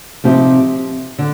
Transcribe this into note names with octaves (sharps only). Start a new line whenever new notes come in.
C3 F3 C4 D#4 G4
D3